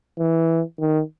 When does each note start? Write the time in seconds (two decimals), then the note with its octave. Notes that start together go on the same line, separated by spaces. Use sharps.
0.19 E3
0.80 D#3